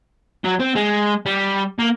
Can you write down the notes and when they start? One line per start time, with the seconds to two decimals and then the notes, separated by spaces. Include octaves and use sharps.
0.44 F#3
0.59 C4
0.75 G#3
1.26 G3
1.79 A#3